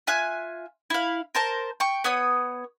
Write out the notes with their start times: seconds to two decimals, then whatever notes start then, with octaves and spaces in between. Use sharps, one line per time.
0.07 F4 E5 G#5 F#6
0.90 E4 F5
1.35 A#4 C5 A5
1.80 G5 C#6
2.04 B3 C#5 D#6